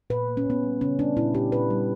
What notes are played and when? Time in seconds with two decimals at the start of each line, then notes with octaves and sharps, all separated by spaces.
0.10 A#2 B4
0.28 A#3
0.37 C#4
0.46 A#2 B3
0.63 G3
0.81 C#3 C#4
0.99 G3 D4
1.17 A#2 E4
1.35 A#2 G4
1.52 A#2 B4
1.70 G3